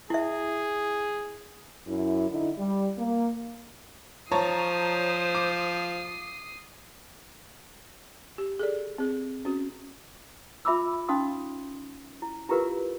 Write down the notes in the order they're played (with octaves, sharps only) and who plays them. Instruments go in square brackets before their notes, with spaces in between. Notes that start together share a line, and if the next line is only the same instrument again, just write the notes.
[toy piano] E4 E5 [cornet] G#4
[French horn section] F#2 E4
D3 D#4 E4
G3
A#3
[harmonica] F3 [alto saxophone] C5 [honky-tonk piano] C#5 A5 A#5 [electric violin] D#6 C7
[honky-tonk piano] D6
[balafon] G4
G#4 A4 D5
C4 G#4
C#4 F#4
[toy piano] F4 E5 B5 D6 E6
C#4 D#4 F5 C6 D#6
E4
E4 F4 G4 A#4 B4 F5